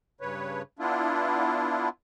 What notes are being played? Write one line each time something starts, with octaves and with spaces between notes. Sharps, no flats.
G2 C#3 B4 C#5
B3 D4 E4 F4